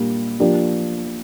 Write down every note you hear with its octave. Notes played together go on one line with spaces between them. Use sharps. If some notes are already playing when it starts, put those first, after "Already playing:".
Already playing: A#2 G3 A#3 D4
F3 A#3 D4 G4